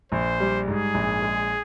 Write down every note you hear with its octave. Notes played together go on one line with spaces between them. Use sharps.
A#1 C5
G3
G#2 G#4
A#1
G#3